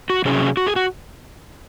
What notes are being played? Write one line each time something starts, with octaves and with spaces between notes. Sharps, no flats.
F#4
C3 F#3 C#4 G#4
F#4
G#4
F#4